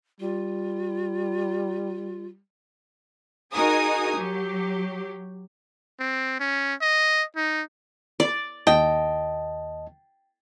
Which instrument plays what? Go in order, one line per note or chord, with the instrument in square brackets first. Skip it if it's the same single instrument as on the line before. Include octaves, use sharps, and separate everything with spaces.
[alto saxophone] G3 [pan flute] F4
[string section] D#4 F#4 G#4 A#4 G#5 D#6
F#3 G4
[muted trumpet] C4
C#4
D#5
D#4
[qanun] D5
[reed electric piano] D#2 D#5 A5 [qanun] G5